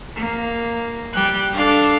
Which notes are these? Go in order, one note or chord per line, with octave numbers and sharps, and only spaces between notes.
A#3
G3 G4 F#6
D4 A4 F5